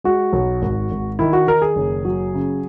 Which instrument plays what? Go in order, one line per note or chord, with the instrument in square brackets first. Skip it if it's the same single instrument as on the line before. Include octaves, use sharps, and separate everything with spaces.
[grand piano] G#3 F#4
B1
G#1
G#1
D#3 E4
F#4
D#3 A#4
G#4
F#1
F#3
C#3